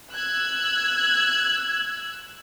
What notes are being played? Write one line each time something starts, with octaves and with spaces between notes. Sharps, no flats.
E6 F#6 G#6